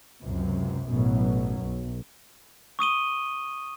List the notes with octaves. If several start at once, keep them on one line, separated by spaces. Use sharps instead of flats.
C#2 F#2 C3
A1 F#2 B2 F#3
B1
C#6 D#6 D#7 G7